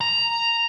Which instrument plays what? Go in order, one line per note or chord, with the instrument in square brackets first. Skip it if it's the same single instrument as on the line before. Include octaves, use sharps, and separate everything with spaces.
[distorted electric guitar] A#5